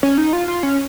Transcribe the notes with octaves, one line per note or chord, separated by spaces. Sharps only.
C#4
D#4
F4
F4
C#4